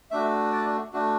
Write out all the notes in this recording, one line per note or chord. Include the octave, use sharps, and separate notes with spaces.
A3 D4 F#4 E5
D5
A3 D4 F#4